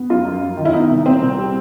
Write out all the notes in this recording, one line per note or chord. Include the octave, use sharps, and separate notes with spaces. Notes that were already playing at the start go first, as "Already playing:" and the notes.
Already playing: B3
F#2 F4
F#2
F#2
D#3
E4
B3 D#4
C2
A#2 C4
C2
G3